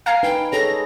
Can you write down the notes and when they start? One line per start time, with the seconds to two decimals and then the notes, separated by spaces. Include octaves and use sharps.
0.06 F5 G#5 A#5 C7
0.23 D#4 B4 G5
0.52 G#4 A4 C#5 A#6